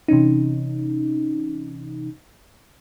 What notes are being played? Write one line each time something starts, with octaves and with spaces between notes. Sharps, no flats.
C3 E3 C#4 D#4